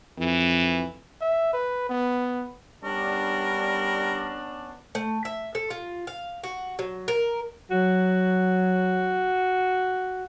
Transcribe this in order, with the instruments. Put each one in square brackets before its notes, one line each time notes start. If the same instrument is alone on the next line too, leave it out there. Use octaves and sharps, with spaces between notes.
[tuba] F2 [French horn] E3
[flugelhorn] E5
B4
B3
[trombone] G3 [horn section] B3 C#4 D4 [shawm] A#4
[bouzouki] A3
E5
A4
F4
F5
F#4
F#3
A#4
[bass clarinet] F#3 [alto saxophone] F#4